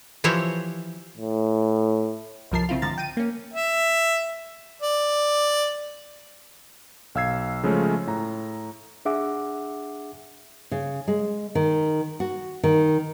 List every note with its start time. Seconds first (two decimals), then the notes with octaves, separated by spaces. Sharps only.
0.24 E3 F3 G4 C5 C#5 E5
1.18 A2
2.52 C2 F#2 F3 A#4 A5 C7
2.69 C#3 C4 E4 F4
2.82 G#2 D3 F3 A#5 A6
2.98 G5 D#7
3.17 A#3 C#4
3.54 E5
4.82 D5
7.15 B1 F5 E6 G#6 C7
7.63 C#3 F3 G#3 A3 C#4
8.07 A2 A#5
9.05 D4 G#4 E5 F#5 D6
10.71 C#3
11.08 G#3
11.55 D#3
12.20 F#4
12.63 D#3